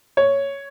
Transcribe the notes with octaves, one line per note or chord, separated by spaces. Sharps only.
C#5